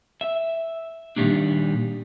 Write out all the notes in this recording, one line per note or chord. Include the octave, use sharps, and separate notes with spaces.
E5
A#2 D#3 F#3 G3 A#3 D4